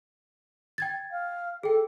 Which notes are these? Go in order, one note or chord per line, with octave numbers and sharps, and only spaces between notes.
G5 G#6 A6
F5
G#4 A4 G5